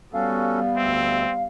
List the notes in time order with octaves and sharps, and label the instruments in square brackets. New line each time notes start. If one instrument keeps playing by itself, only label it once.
[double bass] G3 B3 [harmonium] C#4 F#4 A4 [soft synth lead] F5
[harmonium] D2 E5 [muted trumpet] C4